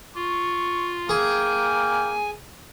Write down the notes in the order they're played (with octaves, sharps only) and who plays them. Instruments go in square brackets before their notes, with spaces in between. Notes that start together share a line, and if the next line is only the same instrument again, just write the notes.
[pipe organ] F4 [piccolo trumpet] C#6
[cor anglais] A#3 [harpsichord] G#4 [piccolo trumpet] G5 [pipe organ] G#5